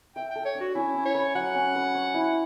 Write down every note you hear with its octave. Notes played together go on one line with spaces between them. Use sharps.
E5 G5
A4 G5
C#5
D4
F#4
C#4 E4
C#4
C#5
B4
F#3 F#5
C#4
B4
C#5
E4